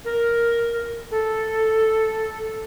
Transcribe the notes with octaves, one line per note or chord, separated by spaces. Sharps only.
A#4
A4